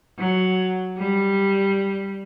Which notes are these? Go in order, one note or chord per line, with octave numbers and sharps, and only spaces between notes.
F#3
G3